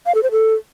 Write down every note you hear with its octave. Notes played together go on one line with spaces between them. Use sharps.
F5
A4
C5
A4